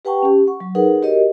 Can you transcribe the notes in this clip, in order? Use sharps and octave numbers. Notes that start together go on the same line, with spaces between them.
G4 B4 F#5 G5 A5 C#6
C#4 G4
F#5 C#6
F#3
D#4 G#4 A#4 B4 F#5
F#4 G4 A#4 C#5 D#5